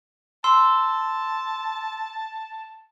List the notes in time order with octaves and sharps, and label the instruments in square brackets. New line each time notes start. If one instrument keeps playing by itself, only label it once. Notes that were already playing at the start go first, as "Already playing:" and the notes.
[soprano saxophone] A5 [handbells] C6 E6